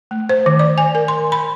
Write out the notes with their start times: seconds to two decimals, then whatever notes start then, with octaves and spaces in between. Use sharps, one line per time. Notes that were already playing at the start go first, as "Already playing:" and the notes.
0.11 A3
0.29 C5
0.46 D#3
0.59 D5
0.78 G#5
0.95 A#4
1.08 C6
1.32 B5